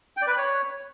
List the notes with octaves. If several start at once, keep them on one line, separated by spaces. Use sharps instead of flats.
G5
D5
B4
B5
C#5